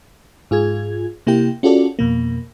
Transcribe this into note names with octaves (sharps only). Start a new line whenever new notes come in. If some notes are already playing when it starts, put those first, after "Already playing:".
G#2 F4 G#4 G#6
C3 A#3 E4 G4 G5
C#4 F4 F#4 G#4 A4 D5
F2 B2 A#3